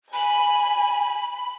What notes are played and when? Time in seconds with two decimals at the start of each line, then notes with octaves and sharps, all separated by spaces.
0.13 G#5 B5